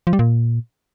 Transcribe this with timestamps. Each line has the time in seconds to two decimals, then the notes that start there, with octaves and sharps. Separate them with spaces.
0.07 F3
0.13 G3
0.19 A#2